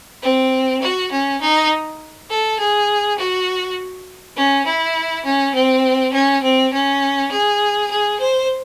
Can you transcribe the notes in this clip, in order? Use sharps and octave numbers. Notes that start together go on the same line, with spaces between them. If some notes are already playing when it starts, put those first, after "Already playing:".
C4
F#4
C#4
D#4
A4
G#4
F#4
C#4
E4
C#4
C4
C#4
C4
C#4
G#4
G#4
C5